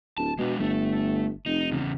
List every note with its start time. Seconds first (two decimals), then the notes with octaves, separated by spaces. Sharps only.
0.17 D1 A5
0.39 B2 G#3 D4
0.60 G1 A3
1.46 F1 D#4
1.71 E2 C#3